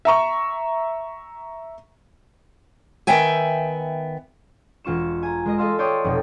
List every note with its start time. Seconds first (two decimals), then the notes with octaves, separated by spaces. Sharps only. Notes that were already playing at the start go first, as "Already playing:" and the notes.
0.05 E5 A#5 C#6
3.07 D#3 B3 E5 G5 G#5
4.84 E1 F4 C#6 E7
5.23 G#5 A#5
5.45 G#3 A#4 D#5 A#6
5.58 A4 D#5 F5 C6 E6
5.79 C#5 D5 G5 C6 C#6 D#6
6.04 F1 B2 A4